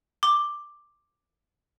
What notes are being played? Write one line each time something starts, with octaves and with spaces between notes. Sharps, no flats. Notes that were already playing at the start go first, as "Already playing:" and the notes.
D6